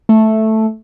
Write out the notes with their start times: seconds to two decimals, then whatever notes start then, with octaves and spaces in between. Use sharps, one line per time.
0.09 A3